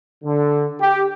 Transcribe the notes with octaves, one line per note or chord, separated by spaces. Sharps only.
D3
G4